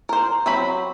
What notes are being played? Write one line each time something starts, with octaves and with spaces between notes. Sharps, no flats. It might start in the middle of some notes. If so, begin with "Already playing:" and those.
A#4 C5
F#3 C4 B5